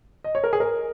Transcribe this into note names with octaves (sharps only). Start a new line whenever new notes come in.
D#5
C#5
A#4
G#4
A#4